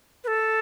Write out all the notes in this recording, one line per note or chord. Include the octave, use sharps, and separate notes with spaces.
B4
A4